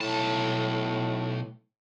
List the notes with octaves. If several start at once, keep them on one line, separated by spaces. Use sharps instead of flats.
B1 A2 A5